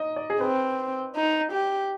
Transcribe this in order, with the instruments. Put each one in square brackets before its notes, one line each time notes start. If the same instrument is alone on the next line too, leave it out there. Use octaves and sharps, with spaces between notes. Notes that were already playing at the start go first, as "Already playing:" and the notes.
Already playing: [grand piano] D#4 D#5
D5
G#4
[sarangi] C4 [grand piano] B4
[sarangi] D#4
G4